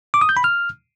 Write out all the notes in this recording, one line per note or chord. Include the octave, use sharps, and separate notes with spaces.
D6
D#6
G6
B5
F6